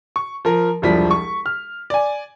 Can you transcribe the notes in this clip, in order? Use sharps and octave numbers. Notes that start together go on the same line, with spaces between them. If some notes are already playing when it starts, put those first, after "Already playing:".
C#6
F3 A#4
E1 C2 F3 D4 B6
C#6
F6
D5 G#5